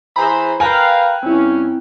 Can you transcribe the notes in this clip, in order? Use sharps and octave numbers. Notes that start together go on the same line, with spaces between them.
E3 G#4 C5 A#5 B5
A#4 B4 F5 G5 G#5 F#6
G2 C4 C#4 E4